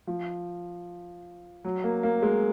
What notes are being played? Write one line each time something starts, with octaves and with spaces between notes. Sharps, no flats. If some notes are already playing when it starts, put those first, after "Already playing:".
F3
F#3
A#3
A#3
G#3